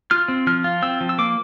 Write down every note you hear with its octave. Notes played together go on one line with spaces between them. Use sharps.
F4 F6
C4
F3 F6
F4
C4 E6
F3
E6
A#3 D6